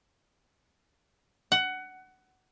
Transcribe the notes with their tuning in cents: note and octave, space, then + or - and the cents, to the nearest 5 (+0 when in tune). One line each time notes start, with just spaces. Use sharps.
F#5 +15